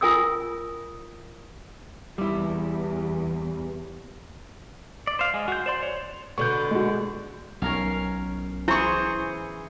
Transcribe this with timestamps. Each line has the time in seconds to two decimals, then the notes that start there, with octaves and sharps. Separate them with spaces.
0.01 F4 A#4 G#5 D#6 E6
2.18 E2 G3 E4
5.07 D5
5.19 C5 F5
5.34 G#3
5.48 F#4 G6
5.66 C5 D5 C6
5.83 C#5
6.38 B2 D3 C#6 G6
6.71 G#3 F#4
7.62 B1 C#4 A#4 F5
8.68 E3 E4 G#4 C5 C#6